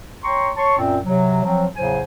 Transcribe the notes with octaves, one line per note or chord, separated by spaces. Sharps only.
C#5 G5 A#5 C6 C#6
C#5 A5 C6 C#6
F#2 A#2 C4
C3 F#3
F3 F#3 C4
E2 A2 C#3 F#3 C5 G#5